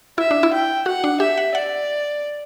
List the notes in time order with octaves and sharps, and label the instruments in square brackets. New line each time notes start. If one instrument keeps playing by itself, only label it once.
[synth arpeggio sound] E4 [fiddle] E5
[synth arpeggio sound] D4
E4
[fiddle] G5
[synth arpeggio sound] F#4 [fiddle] F#5
[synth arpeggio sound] D4
[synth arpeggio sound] G4 [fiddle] E5
[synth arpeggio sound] F#5
[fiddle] D5 [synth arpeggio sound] F#5